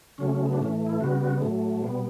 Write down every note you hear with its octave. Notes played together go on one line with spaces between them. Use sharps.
C#3 F#3 A3 C#4
C#4
B3
D4
A2 E3 A3 C#4
E4
C#3 G3 B3 F#4
F#4
A2 F#3 A3
B2 G3 B3